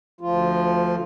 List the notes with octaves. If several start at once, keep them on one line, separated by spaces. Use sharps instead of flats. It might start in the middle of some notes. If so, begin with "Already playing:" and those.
D2 F3 F4